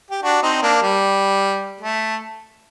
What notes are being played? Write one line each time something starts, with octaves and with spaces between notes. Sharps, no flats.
G4
D4 F#4
C4 D#4
A#3 D4
G3
A3